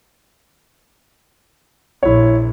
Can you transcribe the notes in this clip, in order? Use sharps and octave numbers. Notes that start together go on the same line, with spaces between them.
A#1 E4 C#5